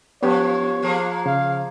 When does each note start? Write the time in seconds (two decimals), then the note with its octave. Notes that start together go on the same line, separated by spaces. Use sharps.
0.23 F#2 F3 B3 G4 C#5
0.82 F3 A#3 G#4
1.26 C#3 F5